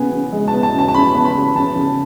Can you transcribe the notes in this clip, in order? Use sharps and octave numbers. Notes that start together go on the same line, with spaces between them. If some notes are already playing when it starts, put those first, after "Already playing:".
Already playing: C#3 B3 G#5
C#3
G#3
A5
B3
A5
C#3 A5
A5
C#3 B5
B3
B5
C#3
C#3 A5
C#3